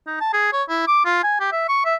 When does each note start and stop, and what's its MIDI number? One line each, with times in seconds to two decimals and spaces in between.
0.07 0.20 63
0.21 0.33 81
0.33 0.52 68
0.53 0.63 73
0.69 0.86 64
0.87 1.03 86
1.05 1.20 65
1.23 1.36 80
1.40 1.48 67
1.52 1.64 76
1.69 1.83 85
1.85 1.95 76